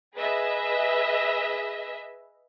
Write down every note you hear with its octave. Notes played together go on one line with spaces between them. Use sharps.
G#4 B4 D#5 E5